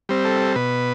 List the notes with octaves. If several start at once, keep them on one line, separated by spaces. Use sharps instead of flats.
G3 C4
A4
B2 B4